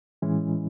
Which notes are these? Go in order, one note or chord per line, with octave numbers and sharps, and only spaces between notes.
A2 E3 G#3 C#4 E4